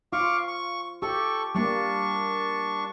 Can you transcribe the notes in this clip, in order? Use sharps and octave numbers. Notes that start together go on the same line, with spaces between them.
F4 F5 C#6 D6
C#6
G4 A4 C#6
G3 A#3 D4 C#6